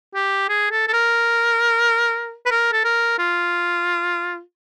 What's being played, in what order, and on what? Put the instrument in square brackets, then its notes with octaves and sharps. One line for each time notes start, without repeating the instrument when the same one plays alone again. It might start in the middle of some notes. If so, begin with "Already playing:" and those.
[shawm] G4
G#4
A4
A4
A#4
B4
A#4
A4
A#4
F4